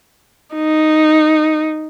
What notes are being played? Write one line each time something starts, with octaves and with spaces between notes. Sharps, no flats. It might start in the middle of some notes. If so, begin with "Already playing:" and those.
D#4